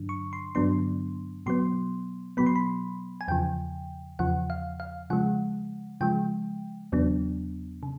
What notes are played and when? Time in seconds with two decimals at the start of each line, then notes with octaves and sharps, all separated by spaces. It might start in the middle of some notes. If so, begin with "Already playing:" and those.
Already playing: G2 D3 F#3 D4
0.09 C#6
0.33 C6
0.55 G2 D3 F#3 B3 D4 C6
1.46 B2 F#3 B3 C6
2.37 B2 F#3 B3 B5
2.46 C6
2.56 B5
3.21 G#5
3.28 E2 C#3 F3 G5
4.19 E2 C#3 F3 F#5
4.50 F5
4.80 F5
5.10 C#3 F3 G#3 F#5
6.01 C#3 F3 G#3 G5
6.92 E2 C#3 F#3 B3 D4
7.83 C#3